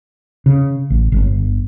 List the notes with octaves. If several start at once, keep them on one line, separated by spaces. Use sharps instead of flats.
C#3
A1
G1